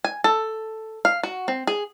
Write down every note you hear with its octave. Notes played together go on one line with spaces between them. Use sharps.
G#5
A4
F5
F#4
C4
G#4